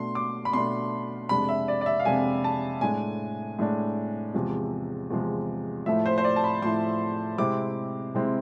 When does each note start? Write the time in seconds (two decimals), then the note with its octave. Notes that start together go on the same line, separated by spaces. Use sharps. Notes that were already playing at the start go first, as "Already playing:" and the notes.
Already playing: B2 A3 D4 C6
0.15 D6
0.45 B5
0.53 B2 A3 D4 C6
1.29 F2 C3 G#3 D4 B5
1.49 E5
1.68 D5
1.81 D5
1.86 E5
2.00 F5
2.05 F2 C3 G#3 D4 G#5
2.44 A5
2.81 A2 G#3 D4 G#5
3.59 A2 G#3 D4
4.34 E2 C3 F3 G#3
5.10 E2 C3 F3 G#3
5.86 A2 F3 A3 E4 E5
6.06 C5
6.18 C5
6.24 D5
6.36 A5
6.44 B5
6.62 A2 F3 A3 E4 C6
7.38 C3 G#3 C4 E4 D6
8.14 C3 G#3 C4 E4